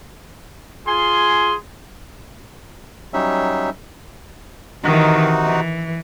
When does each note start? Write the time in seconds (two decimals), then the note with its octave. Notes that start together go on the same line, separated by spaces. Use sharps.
0.87 F4 G#4 G#5 C6
3.14 F#3 G3 C#4 D#4 E5
4.84 C3 D#3 E3 D#4 F#4
5.45 E3